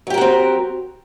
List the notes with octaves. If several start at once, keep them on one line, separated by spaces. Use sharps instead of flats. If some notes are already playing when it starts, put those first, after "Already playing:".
F#3 C4 F#4 G4 A#4